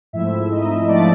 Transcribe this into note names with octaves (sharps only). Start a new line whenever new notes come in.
G#2 F3 A3 C4 E4 E5
D#4 D#5
F3 A3 C4 D4 D5